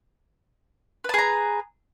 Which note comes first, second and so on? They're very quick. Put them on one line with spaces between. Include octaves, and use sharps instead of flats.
B4 A5 G#4 A#5